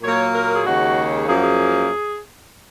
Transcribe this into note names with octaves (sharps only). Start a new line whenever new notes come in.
A#2 F#3 A#3 C#5
A#4
G#4
D#2 C#3 G#3 F#4
F#2 F3 A#3 G#4
F#4
G#4